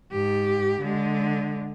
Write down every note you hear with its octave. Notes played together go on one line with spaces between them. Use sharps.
G#2 G4
D3 G#3